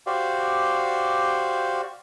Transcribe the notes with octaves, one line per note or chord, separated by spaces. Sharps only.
F#4 G4 C5 D5 F5